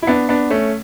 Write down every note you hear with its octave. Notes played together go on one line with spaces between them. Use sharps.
E4
B3 D4
B3 D4
A3 C#4